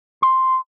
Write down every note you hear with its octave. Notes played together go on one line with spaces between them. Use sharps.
C6